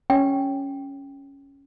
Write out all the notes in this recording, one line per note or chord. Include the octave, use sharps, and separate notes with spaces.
C#4 G5